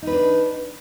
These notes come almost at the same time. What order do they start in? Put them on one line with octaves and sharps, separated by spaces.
D#4 B4 D4